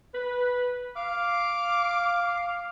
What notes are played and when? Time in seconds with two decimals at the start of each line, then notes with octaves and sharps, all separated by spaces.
0.14 B4
0.96 F5 D6